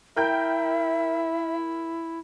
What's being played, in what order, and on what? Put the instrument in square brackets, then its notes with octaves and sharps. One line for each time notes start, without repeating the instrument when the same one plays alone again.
[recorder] E4 [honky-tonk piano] A#4 G5 G6 [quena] E5